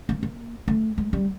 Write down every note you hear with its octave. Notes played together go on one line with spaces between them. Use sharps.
A#3
A#3
A3
G#3
G3